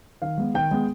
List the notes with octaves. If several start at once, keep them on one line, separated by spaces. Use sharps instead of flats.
D#3 F5
G#3 B3
D#3 G5
G#3 B3